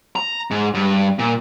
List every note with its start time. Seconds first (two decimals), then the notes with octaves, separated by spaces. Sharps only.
0.16 A#5
0.51 G#2
0.74 G2
1.19 A#2